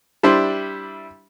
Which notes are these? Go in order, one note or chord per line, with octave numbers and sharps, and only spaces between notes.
G3 D4 E4 C5